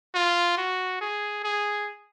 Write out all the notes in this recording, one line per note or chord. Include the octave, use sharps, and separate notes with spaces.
F4
F#4
G#4
G#4